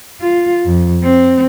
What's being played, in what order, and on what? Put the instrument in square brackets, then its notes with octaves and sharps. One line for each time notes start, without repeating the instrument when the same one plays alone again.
[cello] F4
F2
C4